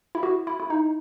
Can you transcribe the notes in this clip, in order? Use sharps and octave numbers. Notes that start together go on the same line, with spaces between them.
E4
F#4
E4
E4
D#4